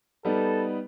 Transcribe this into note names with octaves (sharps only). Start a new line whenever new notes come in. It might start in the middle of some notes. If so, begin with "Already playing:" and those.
G3 B3 D#4 A4